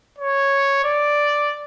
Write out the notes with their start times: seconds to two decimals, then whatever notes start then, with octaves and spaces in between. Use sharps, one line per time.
0.19 C#5
0.85 D5